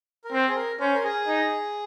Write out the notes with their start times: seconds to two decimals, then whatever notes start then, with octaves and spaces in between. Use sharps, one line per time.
0.24 A#4
0.32 C4 C5
0.48 G#4
0.56 A#4
0.80 C#4 C5
0.94 A#4
1.04 G#4
1.28 D#4